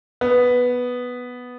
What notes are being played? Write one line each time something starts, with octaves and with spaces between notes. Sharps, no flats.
B3